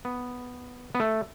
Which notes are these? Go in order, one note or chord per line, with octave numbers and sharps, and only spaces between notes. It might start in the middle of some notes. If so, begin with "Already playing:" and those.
B3
B3
A3